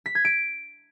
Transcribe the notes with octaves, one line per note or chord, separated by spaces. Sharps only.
B6
G#6
D7